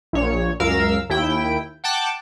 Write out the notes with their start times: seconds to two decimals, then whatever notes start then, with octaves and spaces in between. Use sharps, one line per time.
0.13 A#1 A#2 C#5
0.60 C#2 F#2 A#4 F5 E6
1.10 D#2 E4 G5
1.84 F#5 G5 A5 D6